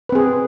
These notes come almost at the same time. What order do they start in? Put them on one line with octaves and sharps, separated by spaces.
B4 C4 G#4